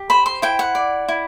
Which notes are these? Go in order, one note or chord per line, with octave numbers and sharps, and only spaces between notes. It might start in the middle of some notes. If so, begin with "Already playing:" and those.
Already playing: G4
C5 B5
C6
E4 G5
F#5
D5
E4